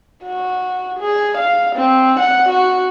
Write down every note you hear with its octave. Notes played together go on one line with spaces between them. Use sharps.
F#4
G#4
F5
C4
F#5
F#4